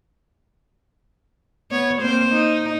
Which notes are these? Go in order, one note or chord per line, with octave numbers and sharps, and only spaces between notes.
B3 C#5
A#3 C4 C5
D#4